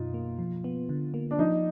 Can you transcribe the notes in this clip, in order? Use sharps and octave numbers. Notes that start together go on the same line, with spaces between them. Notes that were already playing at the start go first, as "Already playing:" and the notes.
Already playing: F#2 B2 D#4 F4
A#3
F3
B3
D3
A#3
D4
F3 D#4